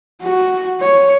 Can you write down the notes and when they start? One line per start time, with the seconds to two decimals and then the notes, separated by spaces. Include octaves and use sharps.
0.22 F#4
0.81 C#5